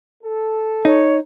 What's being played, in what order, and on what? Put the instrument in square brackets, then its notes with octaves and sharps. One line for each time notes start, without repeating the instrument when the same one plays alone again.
[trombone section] A4
[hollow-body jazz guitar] D#4 [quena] C#5